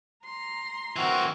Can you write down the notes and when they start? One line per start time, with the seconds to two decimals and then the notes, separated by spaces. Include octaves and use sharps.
0.24 A#5 C6
0.96 E3 C4 F#4 A#4